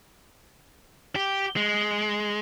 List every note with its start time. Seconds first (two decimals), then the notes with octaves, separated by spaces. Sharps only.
1.16 G4
1.56 G#3